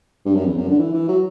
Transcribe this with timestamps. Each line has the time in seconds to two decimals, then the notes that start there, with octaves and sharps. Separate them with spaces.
0.25 G2
0.35 F#2
0.46 E2
0.57 F#2
0.68 D3
0.79 E3
0.94 E3
1.08 F#3